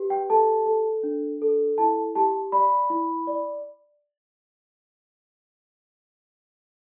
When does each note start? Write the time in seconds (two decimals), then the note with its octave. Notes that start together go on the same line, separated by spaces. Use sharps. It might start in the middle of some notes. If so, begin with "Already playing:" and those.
Already playing: G4 B4
0.10 G5
0.29 A4 A5
0.66 A4
1.03 D4
1.42 A4
1.78 E4 A5
2.16 G4 A5
2.52 D5 B5
2.90 E4
3.27 D5